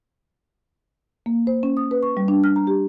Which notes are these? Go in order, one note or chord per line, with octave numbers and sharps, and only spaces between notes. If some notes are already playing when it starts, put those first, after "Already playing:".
A#3
C5
C#4
D#6
B4
C#6
G3
D4
F6
A#5
G4